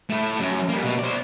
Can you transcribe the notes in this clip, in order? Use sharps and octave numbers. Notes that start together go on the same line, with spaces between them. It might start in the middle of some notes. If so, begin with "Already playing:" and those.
A3 E4
F#2
G3 A#3
B2
C5 D5